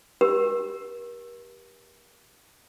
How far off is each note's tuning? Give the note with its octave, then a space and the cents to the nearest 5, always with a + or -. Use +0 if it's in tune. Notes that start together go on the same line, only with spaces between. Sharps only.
G4 +0 A#4 +40